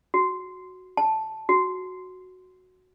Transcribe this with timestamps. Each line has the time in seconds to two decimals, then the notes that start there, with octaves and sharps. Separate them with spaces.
0.14 F#4
0.97 A5
1.49 F#4